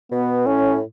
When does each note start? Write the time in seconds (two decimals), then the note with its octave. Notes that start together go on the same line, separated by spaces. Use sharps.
0.12 B2 B3
0.46 A2 C#4